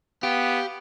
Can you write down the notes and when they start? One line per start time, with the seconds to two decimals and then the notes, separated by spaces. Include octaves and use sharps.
0.23 B3 G4 F5